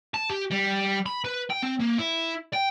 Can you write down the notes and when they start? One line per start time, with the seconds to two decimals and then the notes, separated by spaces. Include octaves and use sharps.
0.14 A5
0.30 G4
0.51 G3
1.06 B5
1.24 B4
1.50 G5
1.63 C4
1.80 A#3
1.98 E4
2.53 G5